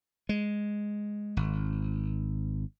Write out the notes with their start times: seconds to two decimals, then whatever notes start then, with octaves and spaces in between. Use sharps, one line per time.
0.29 G#3
1.37 G#1